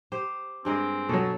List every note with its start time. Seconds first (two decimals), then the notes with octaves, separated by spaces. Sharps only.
0.12 G4 C5
0.65 G2 G#3 C4 A#4
1.09 B2 F#3 A4